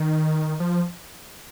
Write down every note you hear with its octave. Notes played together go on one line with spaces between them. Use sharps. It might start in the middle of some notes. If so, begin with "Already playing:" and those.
Already playing: D#3
F3